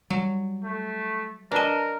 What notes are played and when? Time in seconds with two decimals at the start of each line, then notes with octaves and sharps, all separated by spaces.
0.10 F#3 G3
0.64 A3
1.52 D4 A#4 B4 D#5 A5 A#5